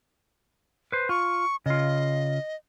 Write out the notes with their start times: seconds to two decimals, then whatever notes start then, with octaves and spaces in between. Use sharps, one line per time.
0.92 B4 C5
1.09 F4 C#6
1.66 C#3 F4 D#5